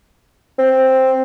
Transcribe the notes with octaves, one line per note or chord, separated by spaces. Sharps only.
C4